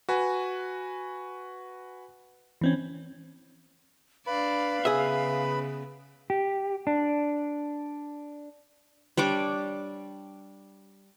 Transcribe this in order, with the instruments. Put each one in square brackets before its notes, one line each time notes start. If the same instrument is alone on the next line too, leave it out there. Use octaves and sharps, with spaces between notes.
[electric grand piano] F#4 B4 G#5
[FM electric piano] E3 C4 C#4
[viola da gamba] D4 D5 [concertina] B4 B5 [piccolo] F5
[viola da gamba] C#3 B3 [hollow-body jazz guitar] G#4 E5
[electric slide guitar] G4
D4
[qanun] G3 D4 C#5 D6